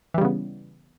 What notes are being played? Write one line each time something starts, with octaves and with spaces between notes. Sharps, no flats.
C#3 E3 G3 B3